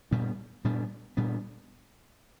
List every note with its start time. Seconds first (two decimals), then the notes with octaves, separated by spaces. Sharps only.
0.11 A#2 G3 B3 D4
0.64 A#2 G3 B3 D4
1.17 A#2 G3 B3 D4